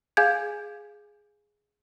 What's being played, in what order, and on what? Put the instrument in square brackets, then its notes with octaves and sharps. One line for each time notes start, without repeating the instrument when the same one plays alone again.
[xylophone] G#4 F5 G#5 G6 G#6